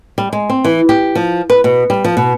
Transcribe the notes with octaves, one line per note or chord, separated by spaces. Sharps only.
G3
G#3
C4
E3
G4
F3
B4
B2
G3
F3
B2